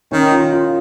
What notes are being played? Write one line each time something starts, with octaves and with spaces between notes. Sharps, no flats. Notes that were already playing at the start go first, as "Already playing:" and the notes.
D#3 C#4
F4
F4